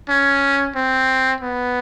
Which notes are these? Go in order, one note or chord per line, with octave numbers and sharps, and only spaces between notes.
C#4
C4
B3